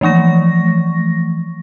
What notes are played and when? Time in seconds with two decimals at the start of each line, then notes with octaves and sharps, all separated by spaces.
0.01 E3 F3 A3 C#6 A#6